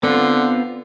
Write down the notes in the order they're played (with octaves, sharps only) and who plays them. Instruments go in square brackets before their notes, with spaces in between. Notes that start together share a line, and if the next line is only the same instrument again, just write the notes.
[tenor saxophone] D3 [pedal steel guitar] B3 C4 F4